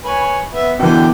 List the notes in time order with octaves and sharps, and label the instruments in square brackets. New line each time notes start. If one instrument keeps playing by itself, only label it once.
[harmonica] B4 C#5 G#5
B3 E5
[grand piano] B2 E3 [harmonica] D3 G4 G5